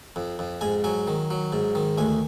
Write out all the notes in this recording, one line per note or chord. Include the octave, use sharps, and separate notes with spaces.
F2
F2
G#2 G#5
F#3 G#5
D#3
F#3
G#2
D#3
D2 G#5